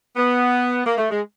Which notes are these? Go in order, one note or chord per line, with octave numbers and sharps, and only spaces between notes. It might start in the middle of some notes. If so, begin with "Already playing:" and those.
B3
A#3
A3
G#3